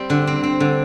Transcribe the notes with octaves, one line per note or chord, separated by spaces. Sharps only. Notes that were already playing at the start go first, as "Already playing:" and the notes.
Already playing: G3 C4
D3
C4
C4
D3